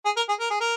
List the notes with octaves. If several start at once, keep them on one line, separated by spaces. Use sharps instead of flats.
G#4
A#4
G#4
A#4
G#4
A#4